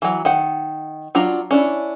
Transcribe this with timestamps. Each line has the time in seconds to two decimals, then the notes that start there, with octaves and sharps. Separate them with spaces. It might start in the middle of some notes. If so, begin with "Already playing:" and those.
0.02 E3 F#3
0.25 D#3 F#5
1.15 F#3 D4 F4 A#5
1.51 C#4 D4 E4